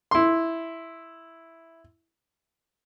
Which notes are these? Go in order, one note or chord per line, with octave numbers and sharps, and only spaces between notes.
E4 C6